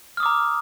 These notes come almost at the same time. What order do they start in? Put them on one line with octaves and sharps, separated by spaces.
F6 D#6 D6 A#5